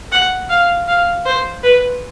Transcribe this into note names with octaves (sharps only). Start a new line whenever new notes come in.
F#5
F5
F5
C5
B4